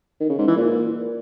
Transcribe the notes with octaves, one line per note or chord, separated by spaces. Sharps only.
D#3
C#3
G#2
E3
A#2